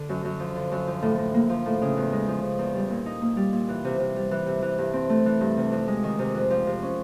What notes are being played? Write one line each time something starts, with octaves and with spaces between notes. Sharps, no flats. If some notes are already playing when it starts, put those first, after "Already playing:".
Already playing: D3
F#2
F#2
F3
D3
F#2
F3
A2
A2
A#3
F3
A2
C#3
E2
G#3
F3
C#3
E2
G3
A#2
D#4
A#3
G3
A#2
E3
C3
C3
G3
E3
C3
E3
G2
C4
A3
E3
G2
C3
F2
G#3
D#3
C3
F2
F3
C3
C#4